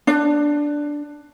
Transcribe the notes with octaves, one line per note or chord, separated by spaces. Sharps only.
D4